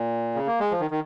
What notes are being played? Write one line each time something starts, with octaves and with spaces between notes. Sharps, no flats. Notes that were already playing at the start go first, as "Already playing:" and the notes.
Already playing: A#2
C#3
A#3
G#3
F3
D#3
D#3